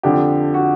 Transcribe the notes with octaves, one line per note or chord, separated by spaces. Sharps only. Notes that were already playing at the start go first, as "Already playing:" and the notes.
F2 D3 F3 G4
F#4